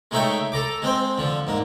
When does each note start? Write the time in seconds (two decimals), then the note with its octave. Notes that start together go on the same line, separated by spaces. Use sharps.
0.11 G#3 A3 D#4 C#5 E5 G5
0.52 A4 A#5 D6
0.82 G#3 C4 C5
1.18 D3 F3
1.47 G#2 A#3